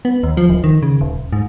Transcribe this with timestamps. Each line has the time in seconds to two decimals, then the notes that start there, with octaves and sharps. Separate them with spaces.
0.05 B3
0.23 D#2
0.37 F3
0.49 D1
0.64 D#3
0.83 C#3
1.01 D#1
1.33 G#2